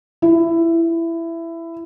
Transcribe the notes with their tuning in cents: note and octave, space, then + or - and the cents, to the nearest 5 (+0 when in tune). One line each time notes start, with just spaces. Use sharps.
E4 +15